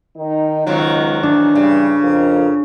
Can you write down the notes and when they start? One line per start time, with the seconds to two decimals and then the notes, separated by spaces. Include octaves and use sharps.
0.17 D#3 D#4
0.66 C#2 G#2 D#3 F#3
1.23 E3 D4
1.55 G2 C#3
2.03 F2 F3 A#4